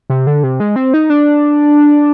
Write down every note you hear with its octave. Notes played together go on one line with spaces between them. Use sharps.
C3
D3
C3
G#3
C4
D#4
D4